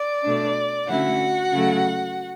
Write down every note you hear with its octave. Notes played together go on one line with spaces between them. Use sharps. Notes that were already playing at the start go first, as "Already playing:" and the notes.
Already playing: D5
B2 A3 D4
D3 A3 C#4 E4 F#4 F#5
C#3 F#3 A3